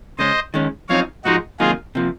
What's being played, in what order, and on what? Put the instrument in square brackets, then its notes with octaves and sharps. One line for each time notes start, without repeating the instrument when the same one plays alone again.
[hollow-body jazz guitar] C#3 G#3 C#4 [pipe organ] C5 D#5
[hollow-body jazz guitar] D#3 G#3 C#4
[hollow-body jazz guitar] F#2 F3 C4 D#4 [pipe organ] C#5 F5
[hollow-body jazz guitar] G#2 F3 G#3 [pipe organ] D#4 F#4
[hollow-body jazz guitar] C3 D#3 F#3 A#3 D#4 [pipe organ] F4 G#4
[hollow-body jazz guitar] C3 F3 A#3